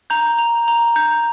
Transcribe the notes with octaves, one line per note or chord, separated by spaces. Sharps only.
A#5 G6
A#5
A#5
G6